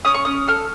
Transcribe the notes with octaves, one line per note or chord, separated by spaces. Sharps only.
C#4 D#6
C#6
C#4 D#6
A4 F6